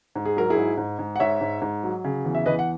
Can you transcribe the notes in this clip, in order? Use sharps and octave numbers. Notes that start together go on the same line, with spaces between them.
G#2
G#4
F#3 A#4
E4 G#4
G#2
G#2
G#2
F#5
G#2 C#5 E5
G#2
G#2
F#3
C#3
E2
E5
E2 B4 D#5
F#5